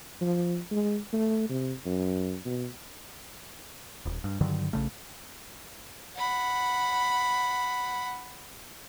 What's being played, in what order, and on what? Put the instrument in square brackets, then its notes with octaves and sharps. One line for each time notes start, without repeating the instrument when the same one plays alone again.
[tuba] F3
G#3
A3
C3
F#2
B2
[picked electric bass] D#1
G2
G2 D3 D#3 F#3
A#1 C#3 A3
[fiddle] F#5 B5